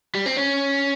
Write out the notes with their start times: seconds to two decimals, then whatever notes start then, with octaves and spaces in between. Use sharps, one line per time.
0.15 G3
0.26 C4
0.37 C#4